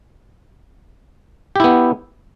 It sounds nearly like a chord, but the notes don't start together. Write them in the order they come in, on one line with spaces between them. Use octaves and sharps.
G4 E4 B3